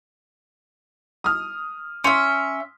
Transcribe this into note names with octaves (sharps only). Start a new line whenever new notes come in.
D#6 F6
C#4 E5 C6